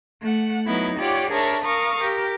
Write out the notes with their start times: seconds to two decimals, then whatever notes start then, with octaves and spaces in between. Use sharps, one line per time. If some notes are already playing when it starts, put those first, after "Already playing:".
0.21 A3 F#5
0.65 F#3 B3 D#4 E4
0.98 F4 G4 C#5 D5 F#5
1.30 D4 G#4 A#4 C#5 E5
1.62 A#4 F5 C#6 D#6
1.98 G4 A#4